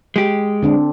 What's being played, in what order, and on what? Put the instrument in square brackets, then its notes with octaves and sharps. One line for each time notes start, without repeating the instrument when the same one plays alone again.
[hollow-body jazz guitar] G#3 G4
[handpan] D3 C4 D4